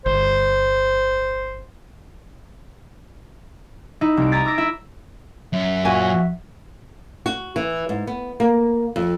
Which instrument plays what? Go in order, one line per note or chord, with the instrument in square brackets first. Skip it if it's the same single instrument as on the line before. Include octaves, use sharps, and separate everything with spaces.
[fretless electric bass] G1 [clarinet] C5
[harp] D#4 E4
C2 D7
A#5 D#6 G#6 A6 B6
D6 E6 A#6 D7
E4 E5
[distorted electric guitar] F#2 [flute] E5
[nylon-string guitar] A#2 F4 G#5 [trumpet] F#4
[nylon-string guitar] F#4
E3
G#2
B3
A#3
F2